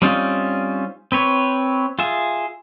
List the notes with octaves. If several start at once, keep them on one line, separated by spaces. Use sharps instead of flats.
G3 C4 C#4 D#4 F4
C4 B4 C#5
F4 G#4 E5